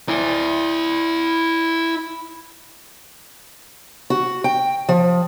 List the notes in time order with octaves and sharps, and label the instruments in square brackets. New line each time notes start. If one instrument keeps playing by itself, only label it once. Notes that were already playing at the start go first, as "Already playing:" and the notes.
[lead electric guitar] E4 D5
[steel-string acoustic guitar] F#4
G5
F3